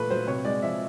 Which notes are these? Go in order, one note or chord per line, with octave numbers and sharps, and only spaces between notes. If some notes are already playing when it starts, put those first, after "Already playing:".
Already playing: A#2 E3 A3 B4
F#3 C5
C3 C#5
G#3 D5
F3 E5